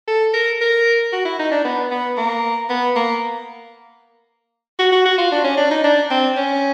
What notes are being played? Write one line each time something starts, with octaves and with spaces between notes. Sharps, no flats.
A4
A#4
A#4
F#4
E4
D#4
D4
B3
B3
A#3
B3
A#3
F#4
F#4
F#4
F4
D4
C#4
D4
D#4
D4
C4
C#4